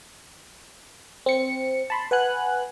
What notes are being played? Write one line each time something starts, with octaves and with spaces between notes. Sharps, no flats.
C4 C#7
A5 B5 C6
B4 F#5 G#5 F#6